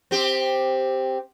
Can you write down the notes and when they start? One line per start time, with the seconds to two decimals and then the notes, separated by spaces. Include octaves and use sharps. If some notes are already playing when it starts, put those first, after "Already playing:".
0.11 C4 G4